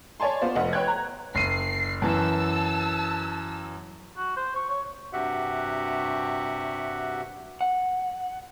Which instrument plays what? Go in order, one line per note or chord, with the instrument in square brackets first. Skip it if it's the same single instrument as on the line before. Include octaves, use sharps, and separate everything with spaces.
[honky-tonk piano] C#5 D5 G#5 A5 C6
B3 F4 C5 D5
F1 D#5 F#5
B4 C#5 G5 F#6 G#6
A#5
[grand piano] F#1 D#7 [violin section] C7
[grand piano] F#2 E3 [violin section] A5 E6
[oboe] F#4
C5
C#6
C#5
[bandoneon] G2 C3 F#4 G4 E5 F#5
[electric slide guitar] F#5